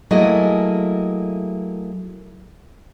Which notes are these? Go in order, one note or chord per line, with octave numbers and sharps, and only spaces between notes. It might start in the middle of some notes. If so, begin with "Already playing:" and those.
F#3 A3 A#3 E4 G#4 D#5